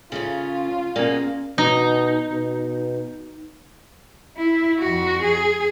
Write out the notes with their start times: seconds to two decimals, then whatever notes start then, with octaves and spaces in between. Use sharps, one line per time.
0.12 C#3 A3 C#4 F4
0.96 B2 A#3 C#4 G#4 D5
1.58 B2 D#4
2.32 B2
4.37 E4
4.79 F2 F#4
5.23 G#4